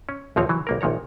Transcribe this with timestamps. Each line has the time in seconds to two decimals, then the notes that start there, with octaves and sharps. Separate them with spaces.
0.09 C#4
0.36 A#1 D#2 F3 C4 C#5
0.49 E3 F#3
0.67 B1 A#3 A#4
0.81 A#1 A#2 D#3 C#5 A#5